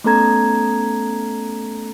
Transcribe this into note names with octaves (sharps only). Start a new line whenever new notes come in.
A3 B3 C#4 A4 A#5 G#6